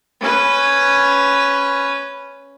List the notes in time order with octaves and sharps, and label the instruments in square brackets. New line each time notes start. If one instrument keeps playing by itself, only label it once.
[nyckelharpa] C#4 B4